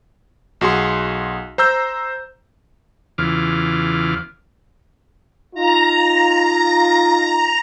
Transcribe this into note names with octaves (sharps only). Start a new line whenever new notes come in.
B1 F#4 G#4 C6
C5 A#5 E6 G6
E2 C#3 E3 F4 D6 F6
D#4 F4 A#5